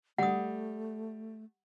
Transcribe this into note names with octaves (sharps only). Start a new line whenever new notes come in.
G3 A3 F#5 D#6